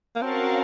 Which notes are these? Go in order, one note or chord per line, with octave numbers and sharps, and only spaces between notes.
A#3
C4 C#4 F#4 A#4 F5 A5